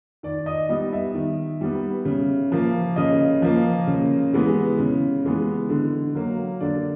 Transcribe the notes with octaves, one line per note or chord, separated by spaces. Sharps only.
D#3 D5
D#5
G3 B3 D#5
E5
D#3
G3 B3
C#3
F3 A#3
C#3 D#5
F3 A#3
C#3
E3 G#3 B3
C#3
E3 G#3 B3
D3
F#3 A#3
D3 D5